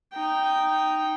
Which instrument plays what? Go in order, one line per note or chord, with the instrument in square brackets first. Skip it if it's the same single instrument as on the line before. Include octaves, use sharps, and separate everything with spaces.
[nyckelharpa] D#4 G5